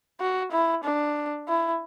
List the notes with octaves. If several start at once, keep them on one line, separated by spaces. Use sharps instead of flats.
F#4
E4
D4
E4